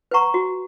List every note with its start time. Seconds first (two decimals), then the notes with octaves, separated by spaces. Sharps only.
0.11 B4 F#5 A#5 C#6
0.34 F#4